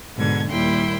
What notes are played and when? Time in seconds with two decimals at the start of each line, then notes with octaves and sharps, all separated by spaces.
0.17 G#2 B2 D3 G#6
0.50 D#2 A#2 G3 E4 G5 C6